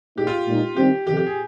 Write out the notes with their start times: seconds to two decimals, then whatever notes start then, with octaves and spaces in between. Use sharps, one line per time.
0.18 A#2 G#3 D#4 G4
0.27 F4
0.48 A#2 G#3 D#4
0.76 C3 D#3 G3 C4 G4
1.07 F2 C3 D#3 G4
1.17 G4
1.26 G#4